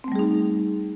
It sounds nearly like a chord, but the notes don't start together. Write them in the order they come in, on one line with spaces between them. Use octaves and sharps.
C4 A3 G3 G#4 D#4